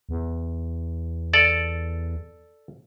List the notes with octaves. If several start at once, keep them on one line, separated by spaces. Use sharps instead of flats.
E2
A4 D5